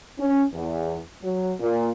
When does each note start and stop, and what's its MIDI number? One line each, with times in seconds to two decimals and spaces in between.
0.19 0.43 61
0.53 1.00 40
1.24 1.52 54
1.60 1.90 46